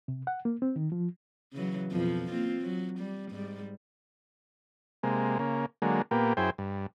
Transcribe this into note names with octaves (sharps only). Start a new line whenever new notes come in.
C3
F#5
A#3
C4
D#3
F3
C#3 E3 F#3
F2 B2 F3
A#3 C4 F4
F#3
G3
G#2 G3
C3 G#3 A#3
C#3 A#3
D3 F#3 G#3 A#3
A#2 A#3 B3 G4
F#2 E4 G#4 C5 G5
G2